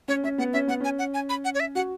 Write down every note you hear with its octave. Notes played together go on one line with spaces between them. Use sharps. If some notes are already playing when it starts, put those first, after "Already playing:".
C#4 C#5
C#4 E5
B3 F#5
C#4 E5
B3 F#5
C#4 G#5
F#5
G#5
B5
F#5
C#5
E5
F#4 F#5